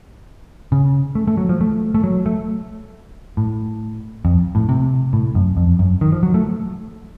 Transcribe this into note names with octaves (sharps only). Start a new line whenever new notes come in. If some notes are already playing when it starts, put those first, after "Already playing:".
C#3
A3
A3
F#3
F3
A3
A3
F#3
A3
A2
F2
A2
C3
A2
F#2
F2
F#2
D#3
F3
F#3
A3